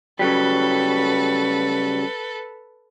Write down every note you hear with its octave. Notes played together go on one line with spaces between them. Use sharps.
C#3 F#3 G3 A4 B4